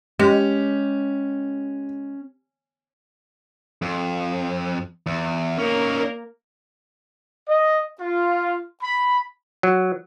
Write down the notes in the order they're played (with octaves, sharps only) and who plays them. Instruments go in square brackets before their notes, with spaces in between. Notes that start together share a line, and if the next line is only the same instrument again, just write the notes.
[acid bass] G#3 [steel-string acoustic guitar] C#4 [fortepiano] G4
[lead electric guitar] F2
E2
[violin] A#3 A#4 [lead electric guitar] C#4 D#4
[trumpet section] D#5
F4
B5
[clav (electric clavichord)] F#3